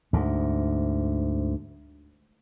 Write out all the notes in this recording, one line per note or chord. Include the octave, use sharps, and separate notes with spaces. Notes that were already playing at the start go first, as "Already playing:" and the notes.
D2 G#2